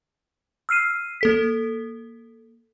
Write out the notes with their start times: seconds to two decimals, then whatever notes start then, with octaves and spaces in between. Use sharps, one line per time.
0.69 E6 F6 C7 D#7
1.21 A#3 A4 B6